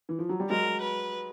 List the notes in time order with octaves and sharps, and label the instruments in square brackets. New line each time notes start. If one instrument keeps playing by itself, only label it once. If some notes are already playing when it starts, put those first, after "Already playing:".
[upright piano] E3
F3
F#3
G3
[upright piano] F#3 G#3 [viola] A#4
[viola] B4